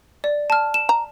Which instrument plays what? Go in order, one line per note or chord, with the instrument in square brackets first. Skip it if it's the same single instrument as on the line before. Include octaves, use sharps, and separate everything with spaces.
[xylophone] D5
A5 F6
E7
[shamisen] A#5